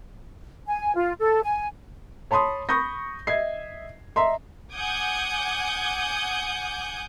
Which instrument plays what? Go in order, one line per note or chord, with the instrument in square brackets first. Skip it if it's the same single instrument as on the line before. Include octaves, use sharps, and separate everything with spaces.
[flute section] G#5
F4
A4
G#5
[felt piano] C#5 A5 B5 C6 D#6
B5 C#6 D#6 G6 A#6
D#5 E5 G#6 C7
D#5 E5 A#5 C6
[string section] F#5 G#5 D6 D#6 G6 G#6